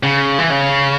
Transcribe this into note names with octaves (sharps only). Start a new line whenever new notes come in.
C#3
E3
C#3